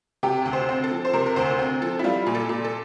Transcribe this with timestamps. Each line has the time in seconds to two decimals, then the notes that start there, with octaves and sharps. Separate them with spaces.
0.23 C3 G4
0.46 D2
0.53 C5
0.69 C4
0.84 A4
0.91 F3
1.05 C5
1.13 C3 A#4
1.26 A#4
1.36 D2 C5
1.59 C4
1.82 F3 A4
1.99 E4
2.04 G3 F4
2.27 A#2
2.35 A4
2.49 A#2
2.64 A4